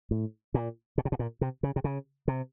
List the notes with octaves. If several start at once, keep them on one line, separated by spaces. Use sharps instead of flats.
A2
A#2
B2
C3
B2
A#2
C3
C#3
C3
C#3
C3